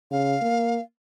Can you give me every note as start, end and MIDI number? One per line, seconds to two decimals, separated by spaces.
0.11 0.36 49
0.11 0.81 77
0.42 0.78 58